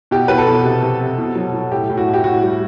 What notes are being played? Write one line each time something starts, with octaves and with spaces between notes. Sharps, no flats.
B2 G4
B2 B4
A4
B2
C3
C3
C3
B2
F#3
F#3
A2 G4
A2
F#4
A2
G4
A2 F#4
G3